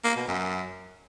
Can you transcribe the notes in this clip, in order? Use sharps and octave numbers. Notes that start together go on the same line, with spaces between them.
A#3
B2
F#2